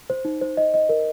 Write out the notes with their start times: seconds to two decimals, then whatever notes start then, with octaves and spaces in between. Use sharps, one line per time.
0.10 C5
0.25 D#4
0.41 C5
0.57 D#5
0.74 D#5
0.89 A#4